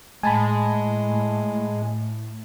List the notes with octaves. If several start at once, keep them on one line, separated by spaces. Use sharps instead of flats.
A2 G#3 G#5 A5 B5